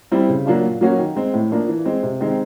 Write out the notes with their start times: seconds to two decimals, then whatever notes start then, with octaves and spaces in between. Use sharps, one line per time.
0.12 G3 C4 E4
0.29 C#3
0.46 F#3 A#3 D4 F4
0.63 A#2
0.81 F#3 A#3 C#4 F#4
0.98 D#3
1.16 G#3 C4
1.33 A2
1.51 F3 A#3 D4
1.68 E3
1.85 G#3 C4
2.03 C3
2.21 D#3 G#3 C4